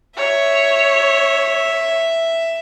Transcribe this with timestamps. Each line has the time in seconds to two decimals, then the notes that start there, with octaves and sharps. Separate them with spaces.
0.18 C#5 E5